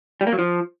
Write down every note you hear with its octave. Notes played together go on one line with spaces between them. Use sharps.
G3
A#3
F#3
F3